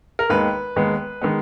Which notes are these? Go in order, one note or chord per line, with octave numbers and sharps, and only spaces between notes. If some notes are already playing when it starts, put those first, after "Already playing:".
A#4
D#2 D#3 G#3 B3 B4
D#2 D#3 G#3 B3
D#3 G#3 B3